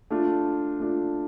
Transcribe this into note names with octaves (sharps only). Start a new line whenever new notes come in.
A3 D4 F4
A3 D4 F4